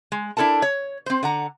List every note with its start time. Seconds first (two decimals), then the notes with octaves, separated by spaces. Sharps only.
0.12 G#3
0.37 D4 E4 A4 A#4 A5
0.62 C#5
1.06 C4 C5
1.23 D3 F#5 A#5